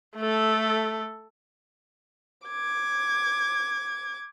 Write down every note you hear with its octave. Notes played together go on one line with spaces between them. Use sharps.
A3 A4
D6 G#6